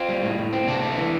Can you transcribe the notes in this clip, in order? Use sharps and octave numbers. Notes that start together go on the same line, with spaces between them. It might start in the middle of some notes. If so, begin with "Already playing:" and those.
Already playing: C4 F4
G3
A2
A2
C4
C3 D4
A3
E3